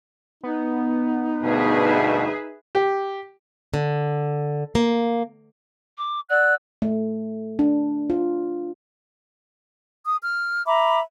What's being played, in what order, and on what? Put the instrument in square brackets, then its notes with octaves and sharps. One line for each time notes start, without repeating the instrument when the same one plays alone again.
[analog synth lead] B3 [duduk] D#4
[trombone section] D2 G2 B2 [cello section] G#4 B4 E5
[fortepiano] G4
[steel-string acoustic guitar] D3
A#3
[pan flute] D6
[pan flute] D5 [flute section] F#5 E6 F#6
[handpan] A3
D4
F4
[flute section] D#6
F6
E5 A#5 B5 D6